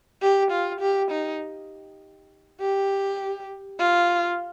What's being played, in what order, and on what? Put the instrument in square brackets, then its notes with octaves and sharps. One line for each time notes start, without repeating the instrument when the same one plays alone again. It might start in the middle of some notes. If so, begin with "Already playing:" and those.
[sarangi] G4
F4
G4
D#4
G4
F4